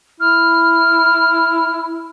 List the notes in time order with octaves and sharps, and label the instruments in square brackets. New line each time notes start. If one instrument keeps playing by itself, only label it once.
[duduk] E4 [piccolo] F6